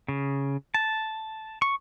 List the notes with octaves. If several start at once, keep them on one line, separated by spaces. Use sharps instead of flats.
C#3
A5
C#6